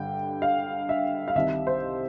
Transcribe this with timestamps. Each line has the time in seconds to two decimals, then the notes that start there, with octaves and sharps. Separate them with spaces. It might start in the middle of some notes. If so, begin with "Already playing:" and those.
Already playing: G2 D3 G3 G5
0.42 F5
0.89 E5
1.28 F5
1.35 C2 C3 D#3 E5
1.67 C5